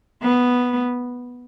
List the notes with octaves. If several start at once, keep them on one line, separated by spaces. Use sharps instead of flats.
B3